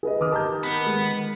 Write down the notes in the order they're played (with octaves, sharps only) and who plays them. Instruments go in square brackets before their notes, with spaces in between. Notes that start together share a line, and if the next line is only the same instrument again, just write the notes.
[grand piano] G#4 B4 D#5
[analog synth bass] D#3 [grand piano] D6 D#6 F6
[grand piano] G4 [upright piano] A5 A#5 G6
[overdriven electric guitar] B3
[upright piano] G#3